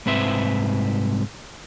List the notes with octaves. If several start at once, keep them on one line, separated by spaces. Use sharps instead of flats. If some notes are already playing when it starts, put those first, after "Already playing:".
C2 G#2 C4 B4 C5 E5